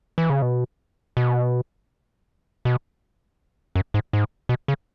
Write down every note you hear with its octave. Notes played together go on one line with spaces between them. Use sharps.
E3
C#3
B2
B2
B2
F#2
G#2
G#2
B2
C#3